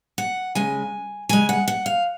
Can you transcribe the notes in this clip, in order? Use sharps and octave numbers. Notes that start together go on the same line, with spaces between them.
F#5
C#3 G#3 G#5
C#3 G#3 G#5
F#5
F#5
F5